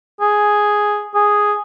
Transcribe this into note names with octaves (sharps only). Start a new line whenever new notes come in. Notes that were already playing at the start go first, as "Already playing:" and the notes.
G#4
G#4